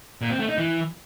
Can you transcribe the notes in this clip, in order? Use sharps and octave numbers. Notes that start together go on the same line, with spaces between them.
A#2
C4
A3
D#4
E3